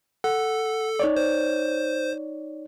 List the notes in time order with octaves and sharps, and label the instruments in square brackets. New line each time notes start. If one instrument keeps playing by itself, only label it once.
[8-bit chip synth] A4 [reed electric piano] F#5
[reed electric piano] D#4 C#5 D5
[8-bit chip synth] C5